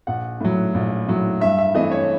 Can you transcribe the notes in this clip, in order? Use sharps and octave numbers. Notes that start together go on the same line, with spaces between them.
A#1 F#5
A2 F#3
A#1
A2 F#3
G2 E5
E5
E3 A3 C4 D#5
C#5